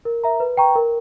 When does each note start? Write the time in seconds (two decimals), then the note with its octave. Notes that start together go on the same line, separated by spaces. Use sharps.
0.05 A#4
0.24 E5 A#5
0.40 B4
0.57 G5 A#5 C#6
0.75 A#4